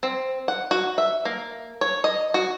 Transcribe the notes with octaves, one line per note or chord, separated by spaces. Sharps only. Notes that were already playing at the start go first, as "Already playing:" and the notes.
C4
F#5
F#4
E5
A#3
C#5
D#5
F#4